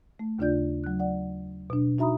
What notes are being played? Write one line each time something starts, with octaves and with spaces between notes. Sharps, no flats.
A3
D#2 C#3 D4 F4 D5 G6
F#3 F#6
D5 F#5
B2 D4
D#4 F#4 E5 A#5 B5 D#6